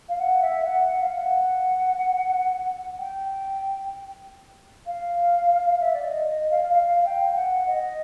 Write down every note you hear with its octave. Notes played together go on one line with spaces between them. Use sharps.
F5
F#5
E5
F#5
F#5
F5
F#5
G5
F5
F5
E5
D5
D#5
D#5
F5
F5
G5
G5
F#5
D#5